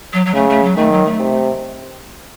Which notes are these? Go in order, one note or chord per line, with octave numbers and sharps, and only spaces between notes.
F#3
F#3
C#3 A3
A3
F#3
D#3 A3
F#3
A3
C3